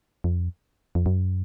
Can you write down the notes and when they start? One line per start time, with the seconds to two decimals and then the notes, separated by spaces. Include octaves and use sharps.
0.24 F2
0.95 F2
1.06 F#2